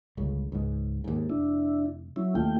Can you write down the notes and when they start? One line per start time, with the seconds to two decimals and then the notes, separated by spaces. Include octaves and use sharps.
0.17 G1 C#2 C#3
0.52 C#2 G#2
1.04 D#2 G#2
1.30 F1 D4 E4
2.16 F#3 C#4 E4
2.35 D#2 A3 F4 G5